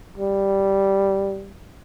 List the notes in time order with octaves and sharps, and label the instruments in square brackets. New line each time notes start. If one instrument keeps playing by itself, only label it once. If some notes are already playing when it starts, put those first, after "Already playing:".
[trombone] G3